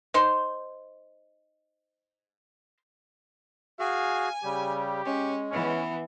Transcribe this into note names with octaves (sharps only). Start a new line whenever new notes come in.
D#4 C5 C6
F#4 G#4 F5 G#5
C#3 G3 G4
G#3 C#4
E3 B3 C#4